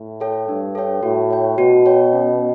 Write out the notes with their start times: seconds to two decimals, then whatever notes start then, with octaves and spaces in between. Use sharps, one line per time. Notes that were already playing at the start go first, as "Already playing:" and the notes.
Already playing: A2
0.20 A4 C#5 G5
0.48 G2 D4
0.75 A4 C#5 G5
1.03 A2 F#4
1.31 C#5 G5
1.58 B2 F#4
1.86 C#5 G5
2.13 C#4